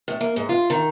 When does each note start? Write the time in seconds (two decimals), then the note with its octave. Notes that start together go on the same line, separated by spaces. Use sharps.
0.08 A2
0.21 A#3
0.36 G#2
0.49 F4
0.70 D#3